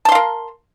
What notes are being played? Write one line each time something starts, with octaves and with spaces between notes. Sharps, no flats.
A#4 F5 A5 C6